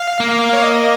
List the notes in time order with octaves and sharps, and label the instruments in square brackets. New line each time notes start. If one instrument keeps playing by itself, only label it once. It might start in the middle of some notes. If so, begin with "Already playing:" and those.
Already playing: [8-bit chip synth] F5
[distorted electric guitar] A#3
[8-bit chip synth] C#5
D#5